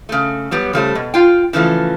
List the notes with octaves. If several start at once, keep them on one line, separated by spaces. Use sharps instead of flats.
C#3 A3
F#3 G3 B3
C#3 G3 A3 C5
B2
F4 G5
C#3 E3 F3 A3